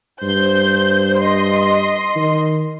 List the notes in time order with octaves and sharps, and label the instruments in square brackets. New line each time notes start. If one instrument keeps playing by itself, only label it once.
[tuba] G2 [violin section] C5 G6
[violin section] D#5 C6
[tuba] D#3